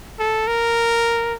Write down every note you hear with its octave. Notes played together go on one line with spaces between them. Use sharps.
A4
A#4